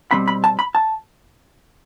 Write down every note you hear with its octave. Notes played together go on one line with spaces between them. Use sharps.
B2 G3 C4 B5
B5
A5
B5
A5